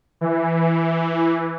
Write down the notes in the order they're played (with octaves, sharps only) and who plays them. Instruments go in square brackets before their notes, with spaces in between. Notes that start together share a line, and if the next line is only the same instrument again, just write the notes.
[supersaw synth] E3